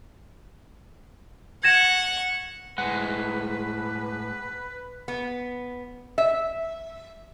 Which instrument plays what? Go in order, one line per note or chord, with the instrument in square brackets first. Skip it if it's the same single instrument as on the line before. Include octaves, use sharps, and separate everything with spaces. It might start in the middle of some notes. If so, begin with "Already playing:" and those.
[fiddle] F#5 C#6 [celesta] G#6 A#6 E7
[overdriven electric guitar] A2 G#3 [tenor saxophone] B4 [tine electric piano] F#5
[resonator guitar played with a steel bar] B3
E5